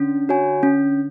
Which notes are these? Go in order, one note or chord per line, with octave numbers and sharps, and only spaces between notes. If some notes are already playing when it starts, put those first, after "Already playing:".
Already playing: D3 C#4
F#4 C#5 G#5
C#4